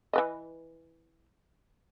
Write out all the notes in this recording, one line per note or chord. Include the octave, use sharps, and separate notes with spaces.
E3 B4 D#5